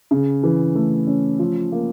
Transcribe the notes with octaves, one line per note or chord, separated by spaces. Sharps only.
C#3
E3
A3
C#4
F3
A#3